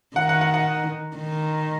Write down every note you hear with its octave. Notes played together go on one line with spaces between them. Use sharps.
D#3 F#5
F#5
F#5
F#5
D#3